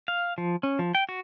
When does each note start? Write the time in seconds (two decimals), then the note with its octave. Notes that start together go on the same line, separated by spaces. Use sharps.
0.08 F5
0.38 F3
0.63 C#4
0.79 F3
0.95 G5
1.09 F#4